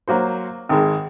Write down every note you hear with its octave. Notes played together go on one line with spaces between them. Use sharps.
F#3 A#3 F#4 C5
G#1 D#3 G#3